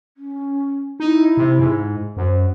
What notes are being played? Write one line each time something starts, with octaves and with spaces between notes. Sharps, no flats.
C#4
D#4 E4
C3
G#2
F#2 C5